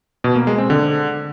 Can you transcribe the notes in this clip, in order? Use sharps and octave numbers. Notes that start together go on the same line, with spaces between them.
B2
A#3
G#3
C4
D3